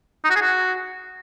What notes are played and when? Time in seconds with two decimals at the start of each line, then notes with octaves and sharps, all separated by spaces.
0.24 D#4
0.30 F#4
0.36 G#4
0.41 F#4